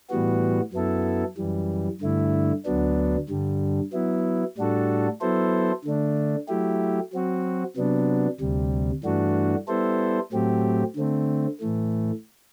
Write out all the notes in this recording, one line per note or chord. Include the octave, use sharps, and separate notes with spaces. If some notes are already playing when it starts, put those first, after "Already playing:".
A2 E3 G3 B3 F#4
F#2 F#3 B3 E4 A4
F#2 E3 G3
G2 D3 A3 E4
D2 D3 F#3 B3 D4
G2 D3 G3
F#3 B3 E4
A2 G3 D4 F#4 A4
F#3 B3 E4 A4 C5
D3 A3 D4
F#3 A3 E4 G4
F#3 C4 F#4
C3 F#3 B3 D4
D2 C3 G3
G2 E3 A3 D4 F#4
G3 B3 E4 A4 C5
A2 F#3 A3 C4 G4
D3 A3 C4
A2 E3 A3